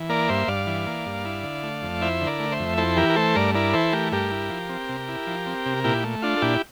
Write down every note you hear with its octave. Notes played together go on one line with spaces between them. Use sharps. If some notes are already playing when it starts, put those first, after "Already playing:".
Already playing: E3
A#3 A#4 D5
G2 C5 E5
G2 D5 F5
E3
A#3
G2
E4
D3
A3
F2
E4 C5 E5
D3
A#4 D5
A3
C5 E5
F2
E4 A4 C5
E3 G4 A#4
A#4
A3 A4 C5
G2 A#4 D5
E4 A#4 D5
E3 A4 C5
A3 G4 A#4
G2 G4 A#4
E4
F3
C4
C3
E4
F3
C4
C3
A#2 E4 G4
A3
D4 F4
A4
A#2 E4 G4